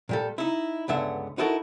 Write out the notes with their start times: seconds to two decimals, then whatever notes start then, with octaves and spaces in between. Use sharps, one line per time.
0.09 A#2 G3 A4
0.38 D#4 E4
0.88 C#2 G2 D3 B3 E5
1.38 D#4 E4 F#4 A4 A#4